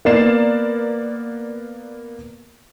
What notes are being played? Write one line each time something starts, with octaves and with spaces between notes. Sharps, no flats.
A#3 B3 A#4 D5 C7 E7